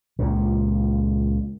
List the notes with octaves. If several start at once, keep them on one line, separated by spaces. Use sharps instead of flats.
C#2 A#2 C#3